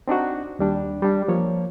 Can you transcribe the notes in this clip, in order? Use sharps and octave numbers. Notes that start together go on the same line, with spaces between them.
C4 D4 D#4 F#4
D#2 G3 D4
G3 D4
F3 A#3 C#5